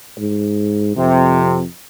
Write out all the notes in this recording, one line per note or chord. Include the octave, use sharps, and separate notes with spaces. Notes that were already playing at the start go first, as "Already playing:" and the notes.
G#2
F2 C3